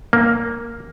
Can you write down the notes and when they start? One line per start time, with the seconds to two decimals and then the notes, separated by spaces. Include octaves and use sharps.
0.13 A#3